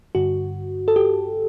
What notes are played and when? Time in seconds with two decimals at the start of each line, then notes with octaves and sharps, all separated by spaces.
0.15 G2 D3 F#4
0.88 A4
0.96 G4